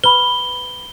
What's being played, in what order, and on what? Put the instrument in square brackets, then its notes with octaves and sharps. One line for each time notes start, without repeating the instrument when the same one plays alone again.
[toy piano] B4 B5 [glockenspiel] G7